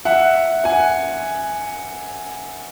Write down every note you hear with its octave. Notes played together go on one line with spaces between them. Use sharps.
E5 F#5
F#5 G#5